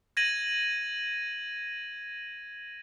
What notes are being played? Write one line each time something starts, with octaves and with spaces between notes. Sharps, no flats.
G#6 A#6 D#7 F#7